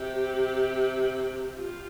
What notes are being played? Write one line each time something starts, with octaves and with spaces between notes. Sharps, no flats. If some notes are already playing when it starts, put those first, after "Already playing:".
Already playing: C3 G4
F4